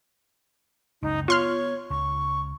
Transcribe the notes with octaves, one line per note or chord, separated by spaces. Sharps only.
F#1 C#2 D#4
B3 F4 C#5 C6 F6
C#2 C#6